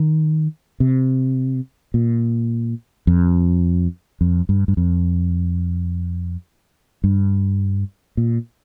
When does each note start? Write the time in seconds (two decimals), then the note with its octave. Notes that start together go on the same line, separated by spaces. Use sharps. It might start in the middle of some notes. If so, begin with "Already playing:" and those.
Already playing: D#3
0.80 C3
1.94 A#2
3.07 F2
4.21 F2
4.49 G2
4.68 G2
4.77 F2
7.04 G2
8.17 A#2